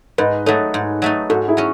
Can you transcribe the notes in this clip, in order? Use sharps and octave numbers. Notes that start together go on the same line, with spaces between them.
G#2 B4 D#5
F#3 A3 D#4 A4 C#5
G#2
F#3 A3 D#4
G#2 F#4 A4
E4 G#4
F#3 C#4